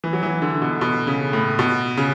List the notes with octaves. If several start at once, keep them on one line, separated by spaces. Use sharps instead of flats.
E3
F#3
E3
D3
B2
B2
C#3
A2
B2
C#3